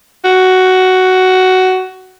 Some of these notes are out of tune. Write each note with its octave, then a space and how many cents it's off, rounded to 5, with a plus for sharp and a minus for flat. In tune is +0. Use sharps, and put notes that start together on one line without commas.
F#4 +10